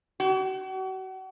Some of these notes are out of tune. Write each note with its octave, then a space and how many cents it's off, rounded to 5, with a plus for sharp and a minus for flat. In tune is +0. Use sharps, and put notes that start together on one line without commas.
F#4 +40